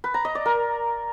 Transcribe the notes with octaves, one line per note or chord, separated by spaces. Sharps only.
B4
A#5
D#5
D5
A#4